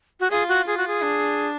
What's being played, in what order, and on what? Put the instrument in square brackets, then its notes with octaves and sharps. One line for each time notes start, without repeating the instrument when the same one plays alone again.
[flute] F#4
[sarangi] F4 [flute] G#4
[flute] F#4
[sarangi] F4 [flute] G#4
[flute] F#4
G#4
[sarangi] D4